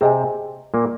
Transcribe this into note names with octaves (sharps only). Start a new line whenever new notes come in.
C3 C4 G#4 D#5 G#5
A#2 A#3